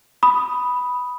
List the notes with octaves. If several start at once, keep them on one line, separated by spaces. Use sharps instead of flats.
B5 D#6